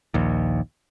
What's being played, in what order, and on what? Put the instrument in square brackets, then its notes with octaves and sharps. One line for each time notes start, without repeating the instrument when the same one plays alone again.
[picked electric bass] A#1 D#2